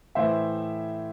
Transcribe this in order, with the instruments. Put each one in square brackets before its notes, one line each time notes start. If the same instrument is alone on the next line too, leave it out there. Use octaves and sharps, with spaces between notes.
[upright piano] A2 E3 C5 E5